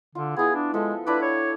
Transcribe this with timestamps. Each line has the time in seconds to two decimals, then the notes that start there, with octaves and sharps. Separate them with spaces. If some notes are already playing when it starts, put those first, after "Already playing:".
0.15 D3 F4
0.37 B3 E4 G#4
0.55 D4
0.74 F3 G#3 A4 E5
1.07 D4 E4 B4 D6
1.22 C#5